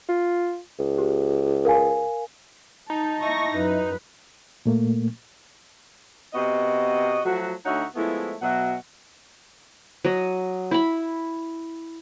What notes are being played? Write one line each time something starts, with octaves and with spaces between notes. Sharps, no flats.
F4
C#2
G4
A#4 F5 G#5
D#4 A5
E4 D#5 E5 C#6 A#6
F#2 B4
A#2 A3 A#3
C3 B3 F#4 D#5
F3 F#3 A3 F#4
D2 D#4 F#4 C#5 E5 F#5
F3 G#3 A3 B3 E4
B2 F#3 E5 F#5
F#3 D#5
E4 B5